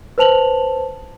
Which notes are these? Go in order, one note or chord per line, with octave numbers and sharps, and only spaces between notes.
B4 C5 A5 F7 F#7